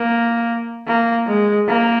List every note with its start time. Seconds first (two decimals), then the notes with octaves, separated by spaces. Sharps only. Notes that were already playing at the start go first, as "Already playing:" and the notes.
Already playing: A#3
0.87 A#3
1.27 G#3
1.67 A#3